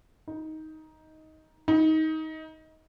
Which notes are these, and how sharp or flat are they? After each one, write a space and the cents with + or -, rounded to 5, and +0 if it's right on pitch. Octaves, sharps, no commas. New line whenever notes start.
D#4 +10
D#4 +20